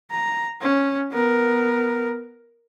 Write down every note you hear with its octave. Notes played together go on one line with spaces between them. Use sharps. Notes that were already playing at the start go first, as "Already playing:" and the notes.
A#5
C#4
B3 A#4